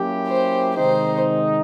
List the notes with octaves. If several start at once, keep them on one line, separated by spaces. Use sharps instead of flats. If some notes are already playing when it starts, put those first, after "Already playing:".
Already playing: F#3 A#3 C#4 E4 G4
C5
C3 D#3 G#3 C4 D#4 C5